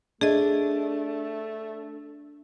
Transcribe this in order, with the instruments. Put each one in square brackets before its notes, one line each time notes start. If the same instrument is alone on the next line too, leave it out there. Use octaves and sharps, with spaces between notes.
[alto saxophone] A3 [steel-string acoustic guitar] D4 [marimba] G#4 D#5